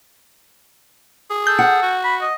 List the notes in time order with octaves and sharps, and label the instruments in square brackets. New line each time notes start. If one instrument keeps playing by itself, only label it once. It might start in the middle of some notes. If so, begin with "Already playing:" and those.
[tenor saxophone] G#4
[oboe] A4 [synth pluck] G6
[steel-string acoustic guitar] F#5
[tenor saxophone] F#4
[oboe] B5
D#5